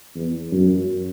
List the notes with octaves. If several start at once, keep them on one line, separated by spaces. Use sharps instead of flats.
E2
F#2